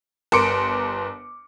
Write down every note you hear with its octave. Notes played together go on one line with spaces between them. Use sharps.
G1 A#4 C6 D6 C#7 D7